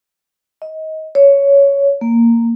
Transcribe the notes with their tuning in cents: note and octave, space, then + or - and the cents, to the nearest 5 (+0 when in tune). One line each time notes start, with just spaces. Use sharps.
D#5 +25
C#5 +10
A#3 -10